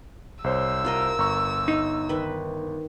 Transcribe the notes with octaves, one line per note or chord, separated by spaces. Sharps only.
C2 C5 C#5 E6
F4 A#4 D#5
G1 A#5 C#6
D#4
D#3 B4